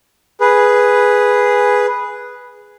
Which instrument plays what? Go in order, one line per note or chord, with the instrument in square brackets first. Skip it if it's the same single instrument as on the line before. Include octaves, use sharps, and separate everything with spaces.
[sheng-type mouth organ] G#4 B4